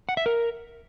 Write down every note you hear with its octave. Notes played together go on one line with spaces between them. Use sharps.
F#5
E5
A#4